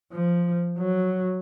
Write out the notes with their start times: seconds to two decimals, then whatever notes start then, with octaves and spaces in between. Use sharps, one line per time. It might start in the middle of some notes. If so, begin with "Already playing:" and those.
0.12 F3
0.78 F#3